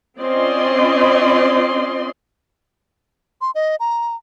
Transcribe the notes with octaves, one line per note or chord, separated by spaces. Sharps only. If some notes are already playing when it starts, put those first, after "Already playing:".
C4 C#4 F4 D5 D#5 C6
C6
D#5
A#5